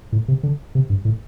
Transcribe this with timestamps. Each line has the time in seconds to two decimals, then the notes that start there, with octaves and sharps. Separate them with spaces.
0.12 A2
0.28 C3
0.43 D3
0.75 C3
0.90 G2
1.05 A2